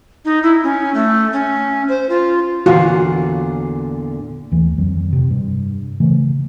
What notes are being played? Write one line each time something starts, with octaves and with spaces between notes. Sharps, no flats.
D#4
E4
C#4
A3
C#4
C5
F4
E2 A#2 D3 F4 F#4
D#2 E3 A3
F2 D#3 F#3
C3
G2
C#3 E3 A3